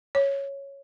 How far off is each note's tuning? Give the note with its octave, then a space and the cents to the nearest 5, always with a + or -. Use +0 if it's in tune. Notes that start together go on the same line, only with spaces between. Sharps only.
C#5 +0